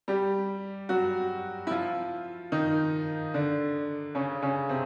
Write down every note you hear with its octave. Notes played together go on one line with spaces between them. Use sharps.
G3 G4
F#3 F#4
E4
F3 F4
D#3 D#4
D3 D4
C#3 C#4
C#3 C#4
C3 C4